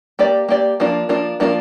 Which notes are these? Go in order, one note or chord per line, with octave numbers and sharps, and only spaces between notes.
A#3 G4 D5
A#3 G4 D5
F3 A#3 D4 F4 A#4
F3 A#3 D4 F4 A#4
F3 A#3 D4 F4 A#4